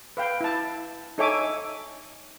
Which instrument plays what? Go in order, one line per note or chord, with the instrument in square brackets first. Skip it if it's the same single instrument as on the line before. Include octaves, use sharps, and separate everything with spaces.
[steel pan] B4 F5 G5
E4 A5
D#4 A4 C#5 E5 G#5 D6